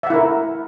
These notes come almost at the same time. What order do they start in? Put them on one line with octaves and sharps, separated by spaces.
E5 F#5 E4 A#4